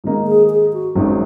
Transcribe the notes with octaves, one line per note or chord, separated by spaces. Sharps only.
G#2 D#3 A#3 D#4
G#4
G#4
F#4
G#1 F#2 D#3 F#3